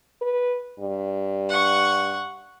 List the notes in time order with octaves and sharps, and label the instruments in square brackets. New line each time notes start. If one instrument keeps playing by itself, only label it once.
[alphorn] B4
G2
[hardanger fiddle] F#5 C#6